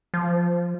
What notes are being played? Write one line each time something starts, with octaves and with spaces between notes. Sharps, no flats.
F3